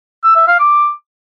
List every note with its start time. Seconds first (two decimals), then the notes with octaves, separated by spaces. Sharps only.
0.24 E6
0.36 E5
0.48 F5
0.59 D6